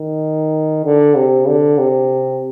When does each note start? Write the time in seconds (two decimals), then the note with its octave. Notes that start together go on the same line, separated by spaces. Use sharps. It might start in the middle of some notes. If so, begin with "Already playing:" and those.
Already playing: D#3
0.85 D3
1.15 C3
1.47 D3
1.78 C3